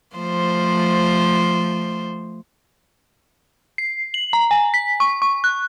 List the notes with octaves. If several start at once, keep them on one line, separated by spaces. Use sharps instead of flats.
F3 A3 C5
C7
F#7
A#5
G#5
B6
C#6
C#6
F#6